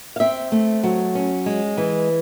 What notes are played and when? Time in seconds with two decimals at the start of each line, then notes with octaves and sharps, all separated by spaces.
0.16 F5
0.20 C4 E5
0.52 A3
0.84 F#3
1.15 C#4
1.46 G#3
1.77 E3